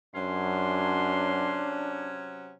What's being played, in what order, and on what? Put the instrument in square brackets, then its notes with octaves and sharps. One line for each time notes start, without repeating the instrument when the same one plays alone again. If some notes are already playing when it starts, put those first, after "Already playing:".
[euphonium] F#2 [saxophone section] C3 F#3 C#4 [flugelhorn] D4 [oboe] C6